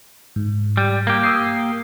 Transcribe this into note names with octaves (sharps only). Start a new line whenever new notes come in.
G#2
G3
A#3 G4
D#6 E6 C7